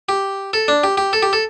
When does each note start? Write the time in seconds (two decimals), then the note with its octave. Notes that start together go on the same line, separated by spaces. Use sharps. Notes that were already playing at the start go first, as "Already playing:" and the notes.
0.09 G4
0.53 A4
0.68 D4
0.84 G4
0.97 G4
1.13 A4
1.23 G4
1.33 A4